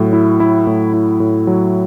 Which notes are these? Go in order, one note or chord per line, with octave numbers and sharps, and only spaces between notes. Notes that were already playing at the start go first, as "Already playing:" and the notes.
Already playing: A2 F#3
E4
E4
A2
E4
A2
F#3